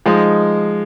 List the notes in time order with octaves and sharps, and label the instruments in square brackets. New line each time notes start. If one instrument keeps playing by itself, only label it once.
[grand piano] F3 G#3 D#4